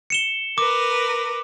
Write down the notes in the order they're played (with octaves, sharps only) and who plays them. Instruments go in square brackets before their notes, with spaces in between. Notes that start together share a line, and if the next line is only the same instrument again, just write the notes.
[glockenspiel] C#7 E7 G7
[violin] A#4 B4 [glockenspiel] D6